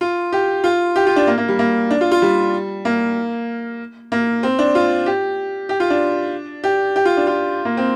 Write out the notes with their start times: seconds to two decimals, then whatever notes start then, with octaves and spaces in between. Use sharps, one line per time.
0.01 F4
0.32 G4
0.64 F4
0.96 G4
1.07 F4
1.16 D4
1.27 A#3
1.38 A#3
1.48 G3
1.59 A#3
1.91 D4
2.01 F4
2.11 F4
2.22 G3
2.85 A#3
4.12 A#3
4.43 C4
4.59 D4
4.75 F4
5.06 G4
5.69 G4
5.80 F4
5.90 D4
6.64 G4
6.96 G4
7.05 F4
7.17 D4
7.27 F4
7.65 A#3
7.77 C4